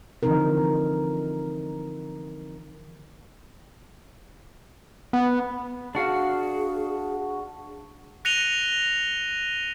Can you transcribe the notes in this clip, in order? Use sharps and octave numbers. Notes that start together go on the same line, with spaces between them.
D3 E3 F3 C4 D#4 A#4
B3
D4 F#4 G#4 F5
F#6 A#6 C#7 D#7 F7 G7